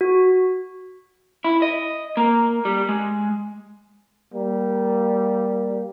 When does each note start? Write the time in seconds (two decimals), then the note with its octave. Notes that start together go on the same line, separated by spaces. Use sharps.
0.01 F#4
1.44 E4
1.62 D#5
2.17 A#3
2.65 G3
2.89 G#3
4.35 G3 A#3